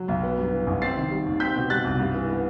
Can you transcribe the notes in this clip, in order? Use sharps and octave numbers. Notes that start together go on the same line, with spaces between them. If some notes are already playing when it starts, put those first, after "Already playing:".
Already playing: F#3
B1
B3
G2
E3
A1
C4 A6 C7
D#3
G3
D#2
C4 G6 B6
B2
G3 F#6 A6
C2
G2
E3
B3